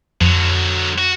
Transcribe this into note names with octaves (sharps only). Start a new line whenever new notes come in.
F2 D3 F#3
F#4